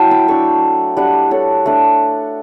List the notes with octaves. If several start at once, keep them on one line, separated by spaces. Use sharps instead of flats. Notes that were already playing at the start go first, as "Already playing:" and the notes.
Already playing: F#3 E4 G5 A5
B5 D6
A3 D4 C#6 E6
G3 D4 D5 F#5
A4 C#5
A3 D4